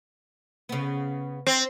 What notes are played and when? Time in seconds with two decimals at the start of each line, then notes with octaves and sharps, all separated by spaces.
0.69 C#3 B3
1.47 C4